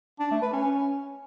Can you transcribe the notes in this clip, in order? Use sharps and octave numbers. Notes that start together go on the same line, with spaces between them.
D4
A3
B4
C#4